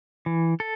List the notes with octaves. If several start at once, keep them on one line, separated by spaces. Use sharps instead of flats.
E3
A4